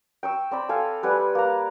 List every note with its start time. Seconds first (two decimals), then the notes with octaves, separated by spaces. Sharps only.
0.23 G5 C#6 E6
0.51 C4 D5 B5
0.69 A4 F5 G#5
1.03 G3 B4 F#5 G#5
1.35 A#3 A#5